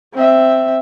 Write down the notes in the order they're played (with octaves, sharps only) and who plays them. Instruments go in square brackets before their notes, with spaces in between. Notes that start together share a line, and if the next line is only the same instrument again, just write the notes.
[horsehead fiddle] C4 E5